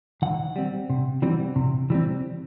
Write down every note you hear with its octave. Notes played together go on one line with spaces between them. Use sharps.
D#3 F#5
G3 C4
C3
E3 G3 C4
C3
E3 G3 C4